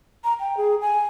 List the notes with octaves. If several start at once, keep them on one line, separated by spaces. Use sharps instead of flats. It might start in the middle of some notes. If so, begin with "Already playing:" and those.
A#5
G5
G#4
G#5